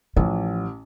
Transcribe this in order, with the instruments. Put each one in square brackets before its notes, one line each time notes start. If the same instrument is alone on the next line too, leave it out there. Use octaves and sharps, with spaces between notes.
[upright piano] A1 [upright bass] F3